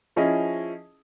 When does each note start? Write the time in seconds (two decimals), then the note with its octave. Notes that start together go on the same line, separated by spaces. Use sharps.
0.16 F3 C#4 E4 G#4 D#5